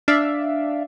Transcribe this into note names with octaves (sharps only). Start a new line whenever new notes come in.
D4 D5 E5 F5